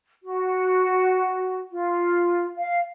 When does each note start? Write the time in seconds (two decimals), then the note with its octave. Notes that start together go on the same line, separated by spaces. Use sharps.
0.23 F#4
1.71 F4
2.56 F5